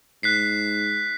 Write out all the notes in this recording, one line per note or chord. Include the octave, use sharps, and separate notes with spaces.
G#2 F#6 B6 C7